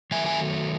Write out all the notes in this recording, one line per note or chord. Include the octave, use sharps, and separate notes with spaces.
D#3 F#3 A3 E5 G#5
E5 G#5